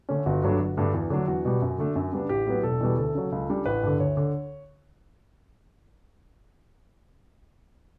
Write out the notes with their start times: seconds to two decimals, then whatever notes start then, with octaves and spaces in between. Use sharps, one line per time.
0.09 D3 A3 C#4
0.26 G1 F#4
0.43 G2 F#3 A3 D4
0.59 G1
0.77 G2 D3 A3 D4
0.94 E2
1.10 D3 F#3 A3 D4
1.27 E2 F#4
1.45 B2 G3
1.62 F#2
1.78 D3 A3 D4
1.96 F#2
2.12 C#3 G3 B3 D4
2.29 A1 G4
2.47 A2 F#3 B3
2.63 E1 A4
2.81 E2 B2 G3
2.98 D2 A4
3.15 C#3 F#3
3.32 C#2
3.49 C#3 G3 D4
3.66 A1 B4
3.83 G2 D3
4.00 D2 C#5
4.17 D3